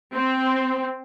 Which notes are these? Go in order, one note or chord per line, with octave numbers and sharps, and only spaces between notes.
C4